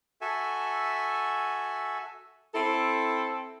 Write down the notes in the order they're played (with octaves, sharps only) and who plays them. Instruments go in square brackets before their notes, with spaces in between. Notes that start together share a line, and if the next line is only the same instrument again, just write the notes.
[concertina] F#4 A4 E5 G#5
[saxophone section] C4 E4 A4